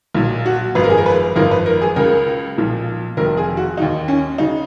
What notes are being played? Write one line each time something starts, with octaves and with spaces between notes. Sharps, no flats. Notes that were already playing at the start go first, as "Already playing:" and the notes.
B1 A#2 F#3
F#4
G#1 F#2 F3 B4
A#4
G#4
A#4
B4
G#1 F#2 F3 A#4
B4
A#4
G#4
C#2 C#3 F#3 A#4
B1 A#2 F3
F1 F2 D#3 F#3 A#4
G#4
F#4
D#2 D#3 F#3 D#4
C#4
C#3 F#3 D#4